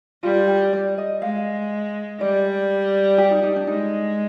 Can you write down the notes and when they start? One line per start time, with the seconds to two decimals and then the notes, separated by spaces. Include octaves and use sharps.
0.23 G3 F4
0.48 G4
0.73 D5
0.98 D#5
1.22 G#3 F5
2.20 G3 D5
3.18 G4
3.31 D#4
3.43 D#4
3.56 D4
3.67 G#3 D#4